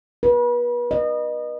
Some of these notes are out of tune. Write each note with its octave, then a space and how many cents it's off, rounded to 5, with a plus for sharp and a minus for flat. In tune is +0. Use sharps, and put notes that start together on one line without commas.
B4 -35
D#5 -30